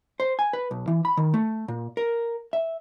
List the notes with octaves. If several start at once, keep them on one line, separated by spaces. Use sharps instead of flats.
C5
G#5
B4
B1
E3
B5
D#3
A3
A#2
A#4
E5